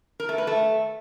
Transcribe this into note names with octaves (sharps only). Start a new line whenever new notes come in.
A#4
A3
B4
A3